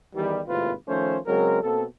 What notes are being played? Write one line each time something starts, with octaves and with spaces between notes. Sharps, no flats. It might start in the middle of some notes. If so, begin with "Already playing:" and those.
E2 D#3 E3 G3
G#1 D#2 A2 C3 F4 B4
D#3 F3 A3 C#4 C5
C#3 F#3 G#3 C4 A#4
B2 A#3 C4 A4